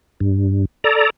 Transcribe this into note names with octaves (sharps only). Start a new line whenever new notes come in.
G2
A4 D5 A#5